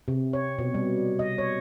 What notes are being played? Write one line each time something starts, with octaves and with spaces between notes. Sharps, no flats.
C3
C#5
B2
G3
D#5
C#5